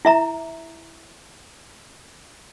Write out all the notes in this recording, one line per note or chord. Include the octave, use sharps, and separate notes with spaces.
E4 E5 A#5